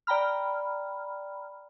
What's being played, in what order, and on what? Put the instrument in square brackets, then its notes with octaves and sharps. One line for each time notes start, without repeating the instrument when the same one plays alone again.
[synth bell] D5 G5 A#5 B5 F6